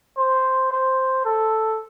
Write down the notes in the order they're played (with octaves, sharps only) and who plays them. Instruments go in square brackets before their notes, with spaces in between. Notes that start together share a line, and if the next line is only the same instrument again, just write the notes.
[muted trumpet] C5
C5
A4